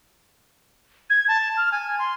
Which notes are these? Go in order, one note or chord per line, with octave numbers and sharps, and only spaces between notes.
G#6
A5
F6
G#5
C6